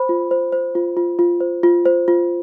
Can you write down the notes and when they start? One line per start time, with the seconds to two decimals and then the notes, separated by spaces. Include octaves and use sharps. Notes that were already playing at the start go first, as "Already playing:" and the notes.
Already playing: C5 B5
0.09 F4
0.31 C5
0.52 C5
0.75 F4
0.97 F4
1.19 F4
1.40 C5
1.63 F4
1.86 C5
2.08 F4